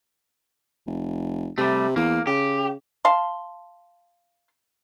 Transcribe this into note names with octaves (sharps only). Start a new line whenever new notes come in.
F1
C3 G3 A3
E2 A#3
C#3 G4
F5 A5 C6